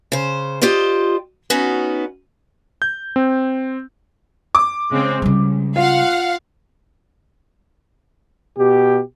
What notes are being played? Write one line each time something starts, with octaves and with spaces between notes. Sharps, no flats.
C#3 C5
F4 G4 C5 D5 D#5
B3 C#4 D#4 F#4
G6
C4
D6
C#3 G#3 C4
C#2 C#3 G3
F4 F5 F#5
B2 G4